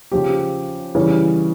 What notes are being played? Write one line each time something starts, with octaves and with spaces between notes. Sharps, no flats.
C#3 F3 G4
C#3 E3 G3